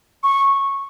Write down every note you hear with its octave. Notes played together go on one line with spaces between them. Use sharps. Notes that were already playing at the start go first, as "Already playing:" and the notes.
C#6